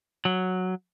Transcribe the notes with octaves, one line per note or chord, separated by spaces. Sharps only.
F#3